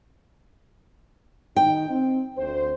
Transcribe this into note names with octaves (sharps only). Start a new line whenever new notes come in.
D#3 D#4 G5
C4
D2 C5